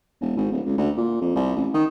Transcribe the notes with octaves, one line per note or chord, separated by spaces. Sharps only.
E1
G#1
D1
C#2
D2
A#2
F2
C2
A1
D#3